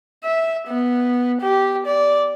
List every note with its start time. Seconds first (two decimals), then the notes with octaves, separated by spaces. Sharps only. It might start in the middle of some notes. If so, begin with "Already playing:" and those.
0.24 E5
0.68 B3
1.41 G4
1.87 D5